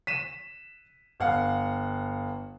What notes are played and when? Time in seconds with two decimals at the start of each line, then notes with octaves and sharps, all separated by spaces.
0.07 B6 D#7 E7
1.20 G1 F5 F#5